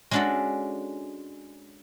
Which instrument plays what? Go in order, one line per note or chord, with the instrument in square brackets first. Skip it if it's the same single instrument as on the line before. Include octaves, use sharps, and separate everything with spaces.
[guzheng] G#3 C#4 D4 F#4 A4 F#5